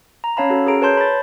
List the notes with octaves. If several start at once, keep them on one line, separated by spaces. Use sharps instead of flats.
A#5
C#4 C#5 F5 A5 B5
C#4 F#4 A4
G#4 A#4 A#5 D7
B4 C#5 A5 C6 G6
B5 A6